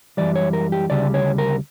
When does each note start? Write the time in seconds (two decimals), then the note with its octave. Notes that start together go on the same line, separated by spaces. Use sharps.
0.17 F#2 E3 G3 D5
0.35 C#5
0.53 A#4
0.72 G4
0.90 D2 C#3 G3 D5
1.14 C#5
1.38 A#4